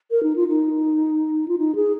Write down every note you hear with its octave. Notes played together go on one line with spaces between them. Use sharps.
A#4
D#4
F4
D#4
F4
D#4
G#4